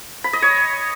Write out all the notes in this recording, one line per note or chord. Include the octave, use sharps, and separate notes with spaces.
B5
D#5
C#5